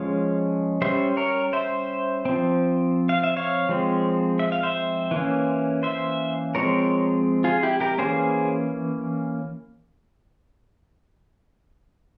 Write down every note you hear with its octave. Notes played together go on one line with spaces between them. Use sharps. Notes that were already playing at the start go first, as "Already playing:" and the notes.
Already playing: F3 G#3 C#4 C#5 F5
G3 C#4 C5 E5
A#4 C#5
C5 E5
F3 C4
F5
E5
C#5 F5
F3 G#3 C4
E5
F5
C5 E5
E3 A#3 C#4
C5 E5
F3 G#3 C4 A#4 C#5
F4 G#4
E4 G4
G4 A#4
E3 A#3 C#4 G#4 C5